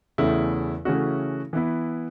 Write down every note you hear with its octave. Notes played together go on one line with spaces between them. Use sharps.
E2 C#3 A3 E4
C#3 E3 A3 C#4 F#4
E3 B3 E4